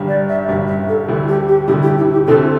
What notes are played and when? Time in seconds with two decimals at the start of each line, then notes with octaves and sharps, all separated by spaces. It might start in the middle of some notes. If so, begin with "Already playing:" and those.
Already playing: G1 G2 G3
0.08 D5
0.29 E5
0.48 G1 G2 G3 E5
0.67 E5
0.89 A4
1.08 D2 D3 G3 E4
1.28 G4
1.48 G4
1.68 D2 D3 G3 E4 G4
1.82 G4
1.98 E4
2.12 G4
2.27 D2 D3 C4 E4 A4